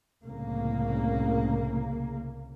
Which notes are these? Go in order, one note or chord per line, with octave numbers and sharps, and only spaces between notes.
C2 A2 C#3 A#3